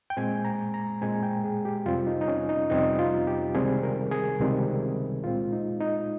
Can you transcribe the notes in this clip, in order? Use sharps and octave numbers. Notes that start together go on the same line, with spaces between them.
G5
A#2 G#3 C4 G#5
A#5
A#5
A#2 G#3 C4 G#5
G5
G#4
G4
F2 C3 G3 C4 F4
D#4
D#4
C#4
D#4
F2 C3 G3 C4 D#4
F4
G4
C#2 C3 D#3 G3 C4 G#4
A#4
G#4
C#2 C3 D#3 G3 C4
A#2 G#3 C4 F4
D#4
D#4